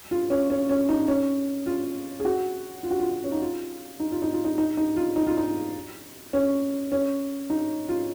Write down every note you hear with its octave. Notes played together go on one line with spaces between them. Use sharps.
F4
C#4
C#4
C#4
D#4
C#4
F4
G#4
F#4
F4
F#4
F4
C#4
D#4
F4
D#4
F4
D#4
F4
D#4
D#4
D#4
F4
D#4
F4
D#4
C#4
C#4
D#4
F4